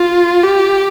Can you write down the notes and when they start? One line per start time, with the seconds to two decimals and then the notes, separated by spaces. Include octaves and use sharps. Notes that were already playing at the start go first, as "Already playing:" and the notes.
Already playing: F4
0.44 G4